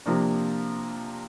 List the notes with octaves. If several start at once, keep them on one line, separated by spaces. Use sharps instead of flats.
C3 F3 A#3 D4